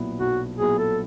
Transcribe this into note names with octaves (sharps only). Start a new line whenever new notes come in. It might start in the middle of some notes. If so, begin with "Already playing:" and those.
Already playing: B1 A#2 F#3 B3 E4
B1 F#4
A#2 F#3 B3 E4 G#4
A4